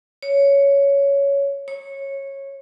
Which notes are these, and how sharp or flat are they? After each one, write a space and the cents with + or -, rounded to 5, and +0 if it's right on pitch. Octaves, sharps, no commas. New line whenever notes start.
C#5 +10
C#5 -15